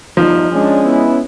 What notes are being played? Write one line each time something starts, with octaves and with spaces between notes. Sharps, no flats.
G1 E2 G2 F3 D#4
G#3 C#4 D4
B3 E4